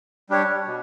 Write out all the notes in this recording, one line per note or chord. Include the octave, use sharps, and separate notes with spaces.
G3 D4 G4 C#5
B2